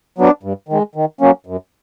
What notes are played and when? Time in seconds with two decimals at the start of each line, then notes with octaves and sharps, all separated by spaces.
0.18 F#3 B3 D4
0.43 G2
0.68 D#3 G#3
0.95 D#3
1.21 F#3 A#3 C#4
1.47 F#2